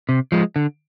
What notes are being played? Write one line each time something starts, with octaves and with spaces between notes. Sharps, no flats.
C3
F3 G#3
D3